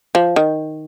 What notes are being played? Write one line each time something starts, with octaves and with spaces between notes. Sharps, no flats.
F3
D#3